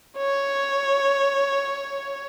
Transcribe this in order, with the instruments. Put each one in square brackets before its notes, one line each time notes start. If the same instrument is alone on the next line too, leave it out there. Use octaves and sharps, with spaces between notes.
[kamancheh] C#5